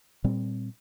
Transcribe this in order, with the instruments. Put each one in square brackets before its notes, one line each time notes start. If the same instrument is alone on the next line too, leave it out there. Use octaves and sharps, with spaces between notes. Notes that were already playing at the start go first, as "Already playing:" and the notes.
[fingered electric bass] A#2 G3 C4